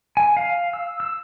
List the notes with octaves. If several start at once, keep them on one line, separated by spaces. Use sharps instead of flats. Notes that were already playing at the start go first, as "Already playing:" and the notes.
G#5
F5
E6
E6